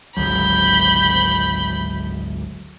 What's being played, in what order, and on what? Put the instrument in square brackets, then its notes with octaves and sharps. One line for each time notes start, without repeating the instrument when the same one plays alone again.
[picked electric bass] G#1 D2 F#3 [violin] B5 G6